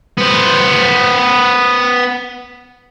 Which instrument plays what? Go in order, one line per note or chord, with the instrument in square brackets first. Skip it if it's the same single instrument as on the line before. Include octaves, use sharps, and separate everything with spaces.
[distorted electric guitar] B3 C5